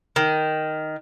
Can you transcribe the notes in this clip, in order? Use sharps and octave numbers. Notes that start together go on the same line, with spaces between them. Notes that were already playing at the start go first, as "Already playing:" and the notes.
D#3